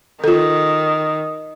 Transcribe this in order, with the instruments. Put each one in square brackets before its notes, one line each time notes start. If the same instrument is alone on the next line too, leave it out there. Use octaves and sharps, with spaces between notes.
[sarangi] D#3 [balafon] F4 A4